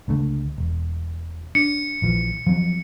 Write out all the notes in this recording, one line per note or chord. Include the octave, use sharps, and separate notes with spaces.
C#2 D3 A3
E1
D4 C#7
A#1 E3 F3
F3 F#3 C4